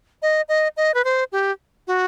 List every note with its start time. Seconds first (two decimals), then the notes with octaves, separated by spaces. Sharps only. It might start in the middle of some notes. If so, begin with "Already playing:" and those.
0.22 D#5
0.49 D#5
0.77 D#5
0.94 B4
1.04 C5
1.32 G4
1.87 F#4